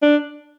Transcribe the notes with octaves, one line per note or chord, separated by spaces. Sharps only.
D4